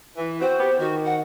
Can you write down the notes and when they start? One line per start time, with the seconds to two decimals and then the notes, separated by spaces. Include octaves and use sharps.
0.17 E3
0.41 C4 F#4 C5
0.60 B3 G4
0.80 D#3 F#4
1.05 F#5